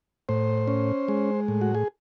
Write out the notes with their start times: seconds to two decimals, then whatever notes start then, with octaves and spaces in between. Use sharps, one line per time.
0.29 A2 C5
0.68 C#4
1.08 G#3
1.48 A2
1.61 F#4
1.75 G#4